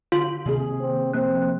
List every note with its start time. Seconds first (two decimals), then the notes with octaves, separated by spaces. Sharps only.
0.12 D3 F4 F#7
0.46 C3 D#3 A#3 G#4
0.81 C4
1.13 F3 A#3 C4 F#6